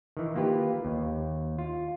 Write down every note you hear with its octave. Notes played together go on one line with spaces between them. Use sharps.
D#3 E3
A#3 F4 G4 B4
D#2
F4